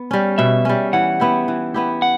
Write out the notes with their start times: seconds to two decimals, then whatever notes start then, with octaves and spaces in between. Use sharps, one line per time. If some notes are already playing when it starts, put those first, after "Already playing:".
Already playing: B3
0.11 G3 C#4
0.38 B2 E5
0.65 G3 C#4
0.93 E3 F#5
1.20 B3 E4 G4
1.48 E3
1.74 B3 E4 G4
2.02 F#5